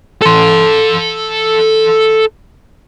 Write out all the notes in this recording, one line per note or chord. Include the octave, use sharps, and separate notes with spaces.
A4 C6